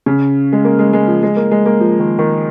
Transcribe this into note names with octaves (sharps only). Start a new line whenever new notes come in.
C#3
G#3
A#3
G#3
G#3
F3
G#3
A#3
G#3
A#3
F3
D#3
D#3